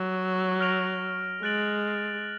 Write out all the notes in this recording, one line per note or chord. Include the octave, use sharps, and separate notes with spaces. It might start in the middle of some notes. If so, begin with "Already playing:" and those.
Already playing: F#3
F6 A#6 D7 F7
G#3 F#6 A6 D7 F#7